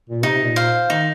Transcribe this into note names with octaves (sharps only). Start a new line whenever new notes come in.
A#2
C3 D#4
A#2
C5 F5
D#3 D#4